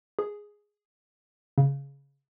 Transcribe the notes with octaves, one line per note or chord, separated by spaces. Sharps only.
G#4
C#3